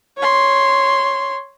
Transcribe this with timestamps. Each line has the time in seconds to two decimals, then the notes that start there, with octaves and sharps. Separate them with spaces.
0.18 C#5 C6